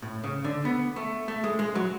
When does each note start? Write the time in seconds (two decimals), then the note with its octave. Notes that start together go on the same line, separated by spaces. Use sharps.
0.02 A2
0.24 C#3
0.44 D3
0.65 B3
0.96 A3
1.28 A3
1.44 G#3
1.59 G#3
1.75 F#3